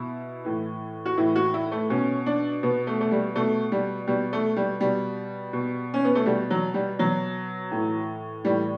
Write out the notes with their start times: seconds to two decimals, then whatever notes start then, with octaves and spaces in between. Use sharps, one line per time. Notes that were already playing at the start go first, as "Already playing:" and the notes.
Already playing: B2 E4
0.45 A2 E3
1.06 F#4
1.17 A2 E3 E4
1.36 F#4
1.54 E4
1.72 A3
1.90 B2 C#4
2.26 D4
2.63 B2 B3
2.87 A3
3.01 A3
3.11 G3
3.36 B2 A3
3.72 G3
4.07 B2 G3
4.33 A3
4.56 G3
4.81 B2 G3
5.53 B2
5.94 C#4
6.05 B3
6.15 A3
6.26 B2 G3
6.50 F#3
6.74 G3
6.99 B2 F#3
7.71 A2 E3
8.44 A2 E3 G3